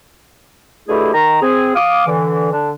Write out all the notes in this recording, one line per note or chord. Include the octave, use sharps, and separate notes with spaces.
B2 D3 A3 E4 G4 G#4
D#3 A#5
C4 G#4
F5 D6 D#6
D3 E3
D3 D4